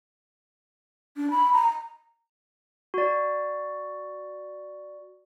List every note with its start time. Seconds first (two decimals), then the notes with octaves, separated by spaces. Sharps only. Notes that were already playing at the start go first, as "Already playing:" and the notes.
1.17 D4
1.31 B5
1.53 A#5
2.94 F#4 D5